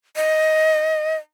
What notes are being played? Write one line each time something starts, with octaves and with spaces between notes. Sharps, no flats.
D#5